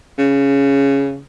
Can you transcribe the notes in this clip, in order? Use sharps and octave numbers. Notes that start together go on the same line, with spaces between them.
C#3